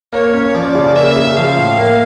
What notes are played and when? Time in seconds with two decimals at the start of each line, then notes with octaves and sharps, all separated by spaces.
0.13 A#3 C#5
0.33 C#4
0.54 F3 D5
0.75 C#3
0.95 A#3 E5
1.16 C#3
1.36 F3 F5
1.57 A2
1.78 A#3